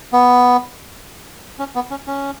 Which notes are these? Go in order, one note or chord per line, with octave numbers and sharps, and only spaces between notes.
B3
C#4
B3
C#4
C#4